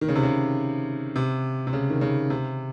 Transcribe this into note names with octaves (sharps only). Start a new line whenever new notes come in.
D#3
C#3
C3
C#3
C3
C3
C#3
D#3
C#3
C3